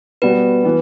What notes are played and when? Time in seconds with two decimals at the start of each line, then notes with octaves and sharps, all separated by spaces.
0.22 B2 G3 B3 F#4 B4
0.64 E3 B3